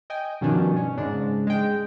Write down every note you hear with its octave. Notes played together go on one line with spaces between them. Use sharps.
D#5 G5 G#5
G2 B2 D#3 F3 C#4 D4
C#4
G#2 C#3 G#3 D4
G#3 G5